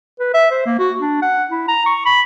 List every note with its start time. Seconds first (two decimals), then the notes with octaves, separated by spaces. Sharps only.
0.19 B4
0.34 E5
0.51 C5
0.66 A#3
0.79 F#4
1.00 D4
1.22 F#5
1.50 E4
1.68 A#5
1.86 C#6
2.06 B5